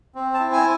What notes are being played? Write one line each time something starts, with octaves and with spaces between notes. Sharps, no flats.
C4
A5
E4
G#5